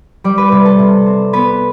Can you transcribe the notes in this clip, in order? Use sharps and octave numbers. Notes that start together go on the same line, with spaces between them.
G3 D5
B4
C3 B4
A4
C3
C4
B3 B4